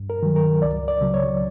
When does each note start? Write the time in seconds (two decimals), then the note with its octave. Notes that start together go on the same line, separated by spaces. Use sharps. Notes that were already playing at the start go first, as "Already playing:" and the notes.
Already playing: G2
0.10 A#4
0.23 D#3 F#3
0.36 A#4
0.62 C#2 D5
0.88 D5
1.01 C#3 F#3
1.14 C#5